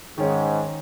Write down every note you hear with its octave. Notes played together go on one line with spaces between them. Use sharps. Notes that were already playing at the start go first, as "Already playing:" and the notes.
G#2 D#3 C#4